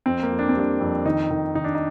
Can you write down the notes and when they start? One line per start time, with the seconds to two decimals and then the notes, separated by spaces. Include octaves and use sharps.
0.06 F2 C4
0.22 A#3
0.30 F2
0.39 D4
0.49 C4
0.56 G3 D4
0.80 F2
1.05 D#3 D#4
1.31 D#3
1.55 D#3 D#4
1.64 D4
1.75 D#4